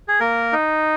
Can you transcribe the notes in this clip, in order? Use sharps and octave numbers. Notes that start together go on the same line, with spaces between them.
G#4
A#3 A#4
D#4